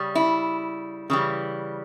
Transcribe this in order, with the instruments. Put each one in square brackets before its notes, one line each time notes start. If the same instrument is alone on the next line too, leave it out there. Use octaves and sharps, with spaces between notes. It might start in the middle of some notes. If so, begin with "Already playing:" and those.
Already playing: [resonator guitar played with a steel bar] C#3 G3
E4
C#3 E3 G3